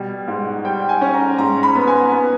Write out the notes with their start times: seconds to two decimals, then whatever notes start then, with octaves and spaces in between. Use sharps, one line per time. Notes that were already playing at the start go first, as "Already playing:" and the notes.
Already playing: B2 G3
0.28 G#2
0.64 G3 G5
0.89 G#5
1.01 C#4
1.14 A#5
1.38 G#2 A#5
1.63 B5
1.75 B3
1.87 G#5
2.12 B3